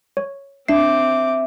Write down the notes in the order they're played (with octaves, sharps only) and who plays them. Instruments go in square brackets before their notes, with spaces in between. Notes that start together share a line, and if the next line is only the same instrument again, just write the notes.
[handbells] C#5
[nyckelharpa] C4 D6 [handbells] D4 C7 [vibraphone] E5